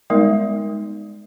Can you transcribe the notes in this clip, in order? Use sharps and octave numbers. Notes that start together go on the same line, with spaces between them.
G3 G#3 B3 D#4 A#4 D5